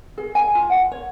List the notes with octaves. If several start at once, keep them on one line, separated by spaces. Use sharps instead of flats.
G#4
G#5
F4
F#5
C#5